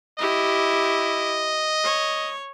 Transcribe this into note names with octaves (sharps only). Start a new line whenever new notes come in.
E4 G4 D#5
C#5